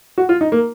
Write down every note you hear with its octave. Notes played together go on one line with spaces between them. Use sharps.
F#4
F4
D#4
A#3